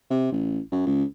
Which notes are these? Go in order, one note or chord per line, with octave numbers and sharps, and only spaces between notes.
C3
A1
F#2
C#2